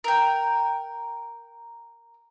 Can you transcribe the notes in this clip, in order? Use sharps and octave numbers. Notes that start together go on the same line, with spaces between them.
A#4 G5